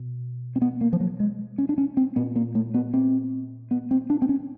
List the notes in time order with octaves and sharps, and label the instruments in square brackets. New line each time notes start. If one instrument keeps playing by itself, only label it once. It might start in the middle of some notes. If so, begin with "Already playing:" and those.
Already playing: [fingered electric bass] B2
C4
B3
A#3
F3
F#3
G#3
C#4
D4
C#4
C4
A#2 B3
A#3
A3
B3
C4
B3
C4
D4
C4
C#4